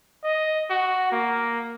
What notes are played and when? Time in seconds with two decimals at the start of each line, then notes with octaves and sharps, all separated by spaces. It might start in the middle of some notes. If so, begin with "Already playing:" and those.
0.24 D#5
0.70 F#4
1.12 A#3